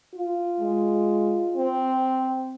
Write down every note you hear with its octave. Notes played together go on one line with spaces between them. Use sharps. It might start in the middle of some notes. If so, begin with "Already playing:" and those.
F4
G#3
C4